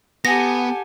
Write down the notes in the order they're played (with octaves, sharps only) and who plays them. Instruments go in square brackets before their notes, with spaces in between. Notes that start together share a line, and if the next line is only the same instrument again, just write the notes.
[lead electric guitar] B3 [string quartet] G4 A4 G#5 [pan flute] F#5 [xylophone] A#6